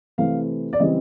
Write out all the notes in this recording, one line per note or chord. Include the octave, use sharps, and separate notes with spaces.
C3 E3 A3 C4 F5
D5
C#3 E3 G3 C4 D#5